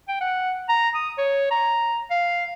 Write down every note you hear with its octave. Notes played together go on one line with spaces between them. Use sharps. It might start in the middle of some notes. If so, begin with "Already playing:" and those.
G5
F#5
A#5
D#6
C#5
A#5
F5